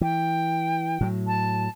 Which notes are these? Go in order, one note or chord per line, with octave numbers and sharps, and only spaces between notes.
E3 G5
A2 F#3
A5